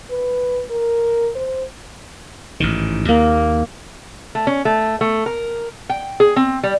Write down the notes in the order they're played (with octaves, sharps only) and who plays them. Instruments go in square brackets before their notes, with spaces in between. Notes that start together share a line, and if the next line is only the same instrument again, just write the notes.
[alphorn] B4
A#4
C5
[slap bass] A1 G#2 D#3
[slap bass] D#2 [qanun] A#3
[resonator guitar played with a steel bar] A3
C#4
A3
A3
A#4
G5
G#4
C4
G3